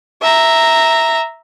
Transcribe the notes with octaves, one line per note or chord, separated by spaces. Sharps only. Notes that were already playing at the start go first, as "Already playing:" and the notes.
E5 A#5